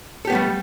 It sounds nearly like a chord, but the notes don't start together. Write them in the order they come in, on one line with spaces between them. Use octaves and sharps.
A4 G4 B3 A3 G3